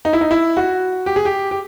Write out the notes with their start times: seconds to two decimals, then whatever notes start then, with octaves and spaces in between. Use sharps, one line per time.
0.05 D#4
0.13 E4
0.21 D#4
0.31 E4
0.57 F#4
1.06 G4
1.16 G#4
1.25 G4
1.51 G4